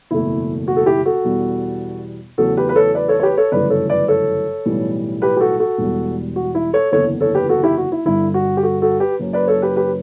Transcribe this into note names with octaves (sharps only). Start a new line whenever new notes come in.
F#1 E2 B2 A3 E4
F#4
A4
E4 G4
F#4 A4
E2 B2 G3
E2 C#3 F#3 A3 F#4 A4
G4 B4
B4
A4 C#5
B4 D5
A4 C#5
C#5
G4 B4
A4 C#5
G1 F#2 C#3 E3 A3 B4 D5
A4 C#5
B4 D5
A4 C#5
B1 A2 E3 G3
G4 B4
G4
F#4 A4
F#4 A4
E1 E2 B2 G3
F#4
E4
A4 C#5
F#1 E2 D3 A4 C#5
A4 C#5
G4 B4
F#4 A4
E4 G4
F#4
E4
G1 G2 D3 E4
F#4
G4
F#4 A4
F#4 A4
G4 B4
F#1 F#2 C#3
B4 D5
A4 C#5
G4 B4
G4 B4